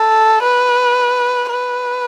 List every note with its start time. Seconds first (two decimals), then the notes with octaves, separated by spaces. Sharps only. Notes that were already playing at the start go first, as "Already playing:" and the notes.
Already playing: A4
0.43 B4
1.51 B4